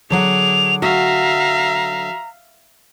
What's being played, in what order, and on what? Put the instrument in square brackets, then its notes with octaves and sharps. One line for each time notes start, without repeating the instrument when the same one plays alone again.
[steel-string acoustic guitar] D3 F#3 F#5 [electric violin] G#4 D6 [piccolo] F7
[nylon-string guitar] F#4 [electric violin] E5 F5 [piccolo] A#5